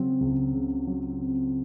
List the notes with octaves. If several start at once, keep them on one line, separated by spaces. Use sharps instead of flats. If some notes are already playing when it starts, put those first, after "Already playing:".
Already playing: C#3 F#3 C4
C#2
C#3
F#3
C4